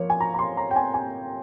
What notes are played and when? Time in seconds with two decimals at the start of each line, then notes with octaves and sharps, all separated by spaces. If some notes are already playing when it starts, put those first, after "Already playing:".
Already playing: F3 A#3 C#5
0.10 G#5
0.21 A#5
0.34 A#5
0.39 C6
0.57 A#5
0.71 G5
0.76 G#5
0.94 G#5